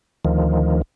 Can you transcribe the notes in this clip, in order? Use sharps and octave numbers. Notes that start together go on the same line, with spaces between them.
D2 D#3 F3